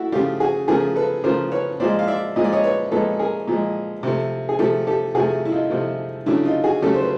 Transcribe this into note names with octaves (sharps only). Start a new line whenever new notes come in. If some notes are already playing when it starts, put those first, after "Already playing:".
Already playing: A3 E4 F#4
C#3 F3 A3 F4 G4
F#4 G#4
C#3 F3 A3 G#4 A#4
A4 B4
C#3 F3 A3 A#4 C5
B4 C#5
A#2 F3 G#3 C5 D5
F5
D5 E5
A#2 F3 G#3 D#5
D5
C#5 D#5
B4 C#5
A#2 F3 G#3 A4 B4
G#4 A#4
A#2 F3 G#3
C3 F3 A3
G#4
C3 F3 A3 G4 A4
G4 A4
C3 F3 A3 F#4 G#4
E4
D#4 F4
C3 F3 A3
C#3 F#3 A3 D4 E4
D#4 F4
F#4 G#4
C#3 F#3 A3 G4 A4
C5
B4